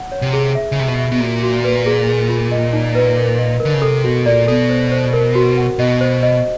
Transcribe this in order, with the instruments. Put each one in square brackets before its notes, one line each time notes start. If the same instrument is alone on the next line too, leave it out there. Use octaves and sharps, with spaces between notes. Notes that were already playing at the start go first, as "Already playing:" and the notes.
Already playing: [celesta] F#5
C#5
[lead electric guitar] C3
[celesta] G#4
E5
[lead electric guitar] C#3
[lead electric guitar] C3 [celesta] E5
[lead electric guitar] B2
[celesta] E5
[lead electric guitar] B2
[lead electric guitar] A#2 [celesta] F#4
[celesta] F#4
B4
G#4
G#4
F4
D#5
D#4
B4
A#4
D#5
A#4
[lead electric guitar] D3
C#3
[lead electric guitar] C3 [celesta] A4
[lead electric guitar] B2 [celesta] F#4
[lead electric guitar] A#2 [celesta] D5
[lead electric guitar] B2 [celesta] A4
[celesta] C5
C5
A#4
F#4
F#5
[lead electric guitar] B2 [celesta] D#5
[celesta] C5
D#5